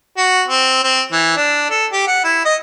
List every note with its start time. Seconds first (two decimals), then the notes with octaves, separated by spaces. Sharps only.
0.17 F#4
0.48 C4
0.83 C4
1.12 E3
1.37 D4
1.70 A4
1.92 G4
2.07 F#5
2.24 E4
2.45 D#5